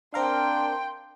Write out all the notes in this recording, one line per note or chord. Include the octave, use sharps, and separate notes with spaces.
C4 D4 A#4 F5 G5 C6